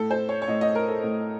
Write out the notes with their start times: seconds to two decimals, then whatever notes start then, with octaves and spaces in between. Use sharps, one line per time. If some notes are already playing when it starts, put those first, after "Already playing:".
Already playing: A2 A4
0.11 C5
0.29 C#5
0.42 C#5
0.48 A2 D#5
0.61 D#5
0.75 A#4
0.88 A4
1.03 A2